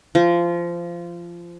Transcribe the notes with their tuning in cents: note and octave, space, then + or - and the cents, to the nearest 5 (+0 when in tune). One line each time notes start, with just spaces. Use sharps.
F3 -20